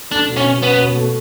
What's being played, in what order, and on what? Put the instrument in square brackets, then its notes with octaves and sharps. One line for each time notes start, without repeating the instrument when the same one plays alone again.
[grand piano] A3 [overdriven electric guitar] D4
[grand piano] B2
[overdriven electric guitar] C#4
[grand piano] B2
[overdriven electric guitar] B3 [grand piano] C#4
[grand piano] B2
A3